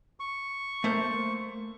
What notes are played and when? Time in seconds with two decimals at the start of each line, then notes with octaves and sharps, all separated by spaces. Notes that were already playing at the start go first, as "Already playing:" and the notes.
0.20 C#6
0.84 A3 A#3 C5